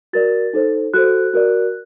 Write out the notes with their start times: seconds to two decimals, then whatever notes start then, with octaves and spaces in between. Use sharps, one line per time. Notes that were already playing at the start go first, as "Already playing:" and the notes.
0.13 F#4 A#4 D5 A6
0.53 D#4 A4 C5
0.94 F#4 A4 C5 F#6
1.34 F#4 A#4 D5